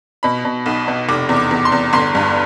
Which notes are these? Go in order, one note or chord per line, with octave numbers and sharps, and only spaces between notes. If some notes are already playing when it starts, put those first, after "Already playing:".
B2 B5
B2
B1
B2
F1 D6
E2
D6
E2
C6
E2
G1 C6
G2